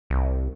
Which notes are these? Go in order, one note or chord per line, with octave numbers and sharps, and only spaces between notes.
C2